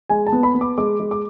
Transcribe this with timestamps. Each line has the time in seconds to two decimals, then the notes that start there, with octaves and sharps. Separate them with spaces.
0.09 G#3 G#5
0.27 A5
0.32 B3
0.43 B5
0.55 B3
0.61 D6
0.78 G#3 D6
1.00 G#3
1.11 D6